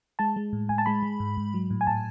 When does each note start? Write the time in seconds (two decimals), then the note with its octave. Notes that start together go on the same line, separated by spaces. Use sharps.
0.19 G#3 A5
0.36 G#3
0.53 A2
0.69 A2 G#5
0.78 A5
0.86 G#3 B5
1.03 G#3
1.20 G#2
1.37 G#2
1.54 F#3
1.70 A2
1.81 G#5
1.87 A2 A5